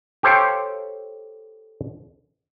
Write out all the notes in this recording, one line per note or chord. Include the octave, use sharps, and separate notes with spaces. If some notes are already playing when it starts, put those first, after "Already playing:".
G4 A4 C5 C#5 F5 G5